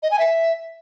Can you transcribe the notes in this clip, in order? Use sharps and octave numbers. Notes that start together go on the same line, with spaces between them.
D#5
G#5
E5